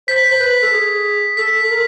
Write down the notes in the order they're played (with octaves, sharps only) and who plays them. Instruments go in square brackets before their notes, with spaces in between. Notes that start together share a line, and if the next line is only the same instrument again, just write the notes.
[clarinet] C5 [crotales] B6
[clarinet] C5
B4
A4
G#4
[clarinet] A4 [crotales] B6
[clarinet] A4
A#4